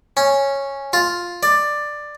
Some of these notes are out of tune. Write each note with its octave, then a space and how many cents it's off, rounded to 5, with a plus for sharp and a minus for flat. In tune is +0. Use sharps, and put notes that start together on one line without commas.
C#4 -5
F4 +5
D5 +10